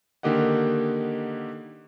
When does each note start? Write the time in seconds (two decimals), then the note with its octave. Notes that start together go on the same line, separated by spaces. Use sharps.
0.23 D3 D#3 A#3 G4 D#5 F#5